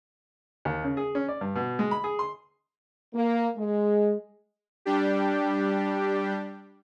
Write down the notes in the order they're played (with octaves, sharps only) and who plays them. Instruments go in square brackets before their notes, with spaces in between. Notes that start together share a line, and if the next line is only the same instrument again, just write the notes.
[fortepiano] D#2
C#3
G#4
C#4
D5
G2
B2
G#3
B5
G#4
C6
[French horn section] A#3
G#3
[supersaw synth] G3 D4 G4